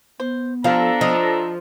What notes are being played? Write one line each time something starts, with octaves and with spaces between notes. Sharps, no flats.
B3 C5
F3 G3 D4 A4 F5 A#5
F3 D#5